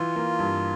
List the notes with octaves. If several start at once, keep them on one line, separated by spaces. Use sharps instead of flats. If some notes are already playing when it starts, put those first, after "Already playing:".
Already playing: E3 F4
A#3
G2